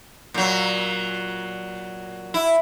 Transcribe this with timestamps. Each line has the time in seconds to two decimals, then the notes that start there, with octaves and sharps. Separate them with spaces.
0.34 A#2 F#3
2.34 E4